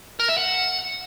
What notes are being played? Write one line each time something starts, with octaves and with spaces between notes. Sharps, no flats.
A#4
E5
F#5